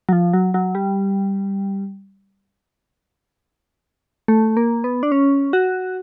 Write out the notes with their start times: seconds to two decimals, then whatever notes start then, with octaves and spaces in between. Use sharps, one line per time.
0.09 F#3
0.13 F3
0.33 F#3
0.54 F#3
0.75 G3
4.28 A3
4.57 A#3
4.84 B3
5.03 D4
5.12 C#4
5.53 F#4